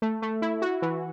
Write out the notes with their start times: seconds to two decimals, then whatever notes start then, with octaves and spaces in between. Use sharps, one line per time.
0.02 A3
0.22 A3
0.42 E4
0.62 F#4
0.82 E3